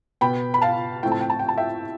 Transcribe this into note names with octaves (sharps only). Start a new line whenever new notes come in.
B2 B3 G5 B5
B5
F5 A5
A2 F3 A3 C4 G5
A5
G5
A5
G5
A5
E5 G5